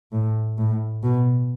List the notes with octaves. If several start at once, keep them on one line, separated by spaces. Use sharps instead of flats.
A2
A2
B2